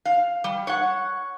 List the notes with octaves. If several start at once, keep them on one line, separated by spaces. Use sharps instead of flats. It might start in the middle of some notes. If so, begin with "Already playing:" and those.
F5
G3
C#5 F#5